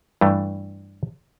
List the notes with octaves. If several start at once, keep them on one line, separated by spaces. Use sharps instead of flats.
G2 E3 A3